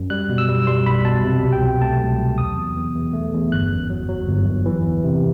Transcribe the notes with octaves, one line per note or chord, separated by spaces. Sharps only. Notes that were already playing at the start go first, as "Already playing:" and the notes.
Already playing: F#2
G3 F#6
B2
E6
G3
G3 C6
B1 B5
B2 A5
C3
C2
G5
F#3
A3 A5
C2
F#3
E2 D#6
E2
E2
E2
A3
E2
G1 F#6
F#2
F#3
F#3
G1
G1
E3
E2
C3